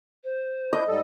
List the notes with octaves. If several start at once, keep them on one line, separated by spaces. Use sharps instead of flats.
C5
D4 E4 D#5 G6
G#2 G3 A4